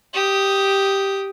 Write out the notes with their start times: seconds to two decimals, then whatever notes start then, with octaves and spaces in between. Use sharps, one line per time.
0.14 G4 D#6